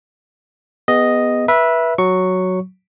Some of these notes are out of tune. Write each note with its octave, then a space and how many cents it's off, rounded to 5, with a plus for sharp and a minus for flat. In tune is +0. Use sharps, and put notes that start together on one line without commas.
B3 +0 G#4 -30 D#5 +0
B4 -25 E5 +0
F#3 +0 C#6 +0